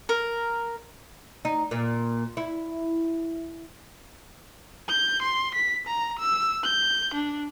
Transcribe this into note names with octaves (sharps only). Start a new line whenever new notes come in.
A#4
D#4
A#2
E4
G6
C6
B6
A#5
E6
G6
D4